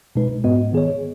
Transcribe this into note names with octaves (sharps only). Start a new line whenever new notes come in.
B2 G#3 D#4 B4
G#2 G#3 B3 F#4 D#5
D#3 B3 G#4 C#5